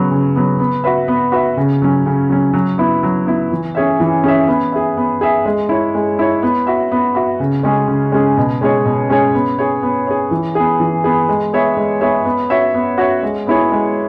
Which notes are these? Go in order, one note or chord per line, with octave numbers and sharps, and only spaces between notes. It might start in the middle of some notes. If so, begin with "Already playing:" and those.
Already playing: C#3 F#3 B3
C#3
F#3 B3
B3
F#4 B4 E5
B3
F#4 B4 E5
C#3
F#3 C#4
C#3
F#3 C#4
F#3
B3 E4
F#3
B3 E4
E3
C#4 G#4 C#5 E5
E3
C#4 G#4 C#5 E5
B3
G#4 E5
B3
G#4 E5
G#3
E4 C#5
G#3
E4 C#5
B3
F#4 E5
B3
F#4 E5
C#3
G#3 C#4 G#4
C#3
G#3 C#4 G#4
B2
G#3 C#4 G#4 C#5
B2
G#3 C#4 G#4 C#5
B3
G#4 C#5
B3
G#4 C#5
E3
B3 G#4
E3
B3 G#4
G#3
B3 G#4 C#5 E5
G#3
B3 G#4 C#5 E5
B3
F#4 C#5 E5
B3
F#4 C#5 E5
G#3
B3 E4 G#4 C#5
G#3